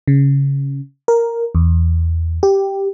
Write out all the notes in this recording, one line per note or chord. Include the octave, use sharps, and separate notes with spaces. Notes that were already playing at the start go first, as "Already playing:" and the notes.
C#3
A#4
E2
G4